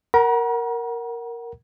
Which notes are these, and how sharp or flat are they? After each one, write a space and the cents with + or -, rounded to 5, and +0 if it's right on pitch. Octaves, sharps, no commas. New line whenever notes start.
A#4 +0 F#5 +15 A#5 +45